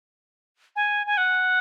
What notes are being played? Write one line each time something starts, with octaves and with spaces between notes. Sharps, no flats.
G#5
G#5
F#5